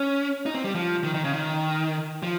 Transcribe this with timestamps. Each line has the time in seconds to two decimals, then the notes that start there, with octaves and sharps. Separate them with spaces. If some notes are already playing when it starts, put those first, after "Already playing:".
Already playing: C#4
0.46 D#4
0.55 C4
0.64 G3
0.75 F3
1.04 D#3
1.14 D#3
1.24 C#3
1.34 D#3
2.23 F3